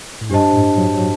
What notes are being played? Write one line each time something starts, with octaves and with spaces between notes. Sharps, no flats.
A2
G2 D4 G4 C5 D#5 A5
A2
F#3
F#3